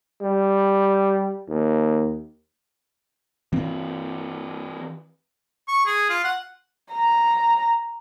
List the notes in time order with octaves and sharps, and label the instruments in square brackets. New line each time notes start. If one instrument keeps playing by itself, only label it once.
[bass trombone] G3
D#2
[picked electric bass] E3 C4
[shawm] C#6
G#4
F4
F#5
[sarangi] A#5